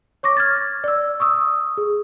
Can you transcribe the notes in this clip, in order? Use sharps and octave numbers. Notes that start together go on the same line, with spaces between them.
C#5 C#6 D6 A#6
F6 G#6 A6
D5 E6
C#6 D#6 E6
G#4